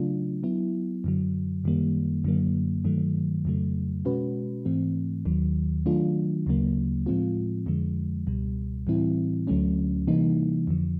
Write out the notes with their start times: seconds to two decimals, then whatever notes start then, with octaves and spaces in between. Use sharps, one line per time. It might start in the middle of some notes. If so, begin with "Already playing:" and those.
Already playing: C#3 F#3 A3 D4 F4
0.43 F#3 B3 E4
1.04 F#2 D3 F#3
1.64 F#2 D#3 G3 A#3
2.24 F#2 D3 F#3 A#3
2.85 G2 D#3 F#3 A3
3.45 F2 C#3 F#3 A3
4.05 B2 G#3 C#4 F#4 B4
4.65 G#2 E3 A3 C4
5.25 D#2 D#3 F#3
5.86 D#3 F#3 A3 D4 F4
6.47 D2 C#3 F#3 A#3
7.06 A2 F3 G#3 C4 F4
7.66 F2 D3 F3 G#3
8.27 C#2 B2 G3
8.87 A2 E3 G3 C4 E4
9.47 D2 D3 F#3 A3 C#4
10.08 C3 E3 G3 A#3 D#4
10.67 F2 D3 F3